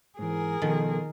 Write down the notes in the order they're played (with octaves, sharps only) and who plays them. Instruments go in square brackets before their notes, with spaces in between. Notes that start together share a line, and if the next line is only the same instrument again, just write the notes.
[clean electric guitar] G#2 E3 [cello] G#4 A#4
[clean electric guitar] B2 F3 A4 [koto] D#3